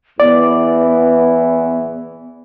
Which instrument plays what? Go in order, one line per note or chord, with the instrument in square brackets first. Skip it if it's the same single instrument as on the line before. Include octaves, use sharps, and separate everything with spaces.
[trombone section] E2 E3 [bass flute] B3 [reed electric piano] D5